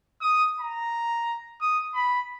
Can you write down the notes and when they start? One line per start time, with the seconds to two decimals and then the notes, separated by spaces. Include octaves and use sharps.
0.21 D#6
0.60 A#5
1.61 D#6
1.94 B5